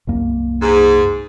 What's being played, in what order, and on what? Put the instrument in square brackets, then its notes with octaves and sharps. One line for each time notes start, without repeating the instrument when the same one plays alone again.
[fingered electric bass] C2 F#2 A#3
[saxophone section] G#2